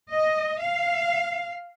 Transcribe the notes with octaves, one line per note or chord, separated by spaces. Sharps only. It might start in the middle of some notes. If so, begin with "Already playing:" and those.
D#5
F5